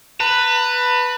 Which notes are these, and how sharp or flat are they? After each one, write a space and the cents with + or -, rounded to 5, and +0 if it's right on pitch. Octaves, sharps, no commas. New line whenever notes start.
B4 +0 A5 +45